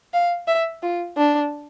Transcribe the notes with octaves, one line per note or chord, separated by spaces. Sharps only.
F5
E5
F4
D4